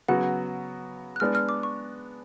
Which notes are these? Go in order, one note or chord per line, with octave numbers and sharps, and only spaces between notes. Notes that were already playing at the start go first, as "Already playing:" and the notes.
C#3 F#3 B3 F#4 F#5
F#6
G#3 B3 D4 F6
F6
D6
C#6